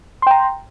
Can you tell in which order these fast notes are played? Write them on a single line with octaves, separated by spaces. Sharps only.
C6 G5 A#5